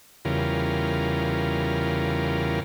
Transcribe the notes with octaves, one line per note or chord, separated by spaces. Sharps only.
E2 C#3 G3 F4 A#4